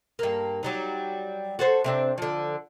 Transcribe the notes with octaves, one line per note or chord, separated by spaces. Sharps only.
G2 A#3
F#3 G3 D#4
F#4 A4 C5
C3 C4 D4
D3 F3